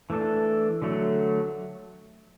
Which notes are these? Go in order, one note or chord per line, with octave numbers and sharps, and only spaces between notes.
E3 A3 D4 A4
D3 F#3 A3 F#4